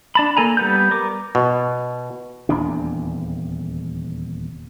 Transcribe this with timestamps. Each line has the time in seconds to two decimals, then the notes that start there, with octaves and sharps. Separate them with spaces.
0.15 D4 A5 B5
0.37 A#3 A4 G#5 A#5
0.57 G3 B3 G6
0.91 A#4 D6
1.35 B2
2.49 D#1 E2 C3 D4